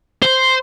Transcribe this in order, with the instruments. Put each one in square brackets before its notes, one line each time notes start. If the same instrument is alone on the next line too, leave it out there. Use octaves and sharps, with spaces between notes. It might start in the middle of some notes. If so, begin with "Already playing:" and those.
[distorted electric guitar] C5